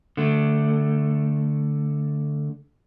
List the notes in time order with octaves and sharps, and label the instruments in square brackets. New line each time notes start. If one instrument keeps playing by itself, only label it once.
[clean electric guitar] D3 A3